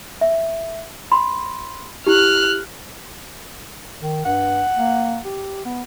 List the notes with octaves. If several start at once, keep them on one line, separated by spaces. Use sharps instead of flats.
E5
B5 C6
E4 G4 F6 F#6
D#3
G2 F#5
A#3
G4
B3